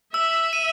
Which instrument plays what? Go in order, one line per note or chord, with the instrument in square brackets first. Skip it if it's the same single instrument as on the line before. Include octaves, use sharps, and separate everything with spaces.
[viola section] E5 [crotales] E6
[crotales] D#7